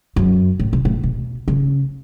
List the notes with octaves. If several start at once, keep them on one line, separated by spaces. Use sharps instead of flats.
F#2
A2
B2
A2
B2
C#3